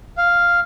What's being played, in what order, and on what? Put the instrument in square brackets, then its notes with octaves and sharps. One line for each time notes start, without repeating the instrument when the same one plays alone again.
[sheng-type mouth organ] F5